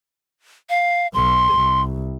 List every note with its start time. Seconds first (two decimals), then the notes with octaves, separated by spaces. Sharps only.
0.69 F5
1.14 B1 C6
1.53 C2